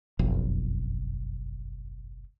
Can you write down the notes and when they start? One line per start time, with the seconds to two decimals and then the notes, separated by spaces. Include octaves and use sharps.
0.19 F#1 B1 F2